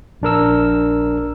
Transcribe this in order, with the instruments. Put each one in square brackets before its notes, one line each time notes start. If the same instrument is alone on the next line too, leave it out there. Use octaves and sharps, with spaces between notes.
[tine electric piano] A#1 D4 A#4 E6